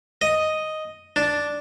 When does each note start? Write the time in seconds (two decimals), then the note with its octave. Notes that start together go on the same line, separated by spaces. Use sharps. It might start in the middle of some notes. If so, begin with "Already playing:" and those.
0.22 D#5
1.16 D4